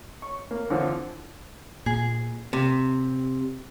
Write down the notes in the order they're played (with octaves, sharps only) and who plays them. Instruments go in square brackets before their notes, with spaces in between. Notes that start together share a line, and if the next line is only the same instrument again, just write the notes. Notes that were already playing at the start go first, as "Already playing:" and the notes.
[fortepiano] C#6
A#3
D3 E3 F3 C4
[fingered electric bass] A#2 [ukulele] G#4
[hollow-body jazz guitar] C3